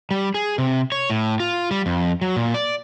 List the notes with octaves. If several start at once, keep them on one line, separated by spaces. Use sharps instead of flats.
G3
G#4
C3
C#5
A2
F4
G3
F2
F#3
A#2
D5